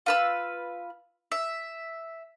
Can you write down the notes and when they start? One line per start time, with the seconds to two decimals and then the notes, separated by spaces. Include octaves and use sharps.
0.06 F4 B4 E6
1.32 E5